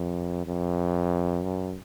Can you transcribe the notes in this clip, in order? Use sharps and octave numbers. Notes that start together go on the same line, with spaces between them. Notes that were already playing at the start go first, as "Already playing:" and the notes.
Already playing: F2
F2
F#2